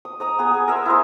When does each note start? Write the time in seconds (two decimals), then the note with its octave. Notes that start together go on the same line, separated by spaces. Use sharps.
0.05 D#6
0.20 D#5 A#5 D#6
0.39 B3 G#4
0.51 G#4 G#5
0.68 A#4 E5 A#5 C6
0.86 E4 C5 D#5